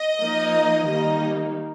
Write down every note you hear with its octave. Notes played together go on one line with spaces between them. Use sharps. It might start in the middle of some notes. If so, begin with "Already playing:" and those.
Already playing: D#5
F3 A#3 D#4
D#3 G3 A#3 D#4 D#5